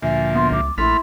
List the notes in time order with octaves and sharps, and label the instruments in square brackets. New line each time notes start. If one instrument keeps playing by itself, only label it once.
[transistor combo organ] D2 A#2 F3 [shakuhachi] E5 [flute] G#5
[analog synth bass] B3 [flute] C6
[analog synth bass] C#2 [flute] D6
[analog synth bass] A#1 [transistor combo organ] A3 B5 F6 [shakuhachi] E4 [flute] C6